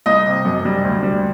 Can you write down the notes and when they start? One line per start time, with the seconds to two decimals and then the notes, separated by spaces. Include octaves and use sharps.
0.06 C2 D#5
0.26 C3
0.45 F#2
0.65 G3
0.84 D2
1.03 G3